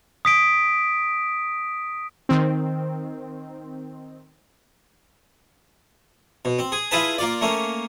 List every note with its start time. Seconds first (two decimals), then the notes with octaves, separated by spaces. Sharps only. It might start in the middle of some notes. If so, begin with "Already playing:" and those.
0.25 D#6 B6 D7
2.29 D#3 C4
6.45 B2
6.59 C4
6.72 G#4
6.91 E4 F4 G#4 B4 A5
7.18 A#3 F4 D5
7.41 A3 A#3 C#4